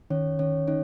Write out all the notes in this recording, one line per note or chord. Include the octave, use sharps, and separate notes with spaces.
D#3 C#4 C#5
D#3 C#4 C#5
C#4 D#4 C#5